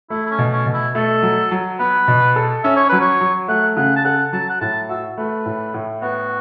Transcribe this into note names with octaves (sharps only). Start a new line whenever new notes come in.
A3 E4
E4
C#4
B2
C#4
B2
E4
A3 A4
F#3
F#3
B3 B4
B2
A4
C#4 E5
C#5
F#3 B4
C#5
F#3
A3 F#5
C#3 F#5
A5
A4 F#5
F#3 A5
F#5
A2 A5
F#4 E5
A3 B4
A2
A2
B3 F#4